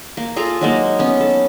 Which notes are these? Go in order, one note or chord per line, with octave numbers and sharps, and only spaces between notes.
A#3
F4 G#4 A4 A#5
F#3 G#3 A#3 D#4
B3 C#4
A4